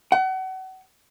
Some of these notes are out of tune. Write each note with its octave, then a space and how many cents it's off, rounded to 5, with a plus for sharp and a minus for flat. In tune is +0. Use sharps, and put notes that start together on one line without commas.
F#5 +35